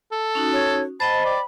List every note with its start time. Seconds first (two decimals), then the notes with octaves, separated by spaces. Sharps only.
0.12 A4
0.35 C#4 D#4 F#4
0.53 C#5
1.00 C5 D#5 G5 A5 B5
1.25 D5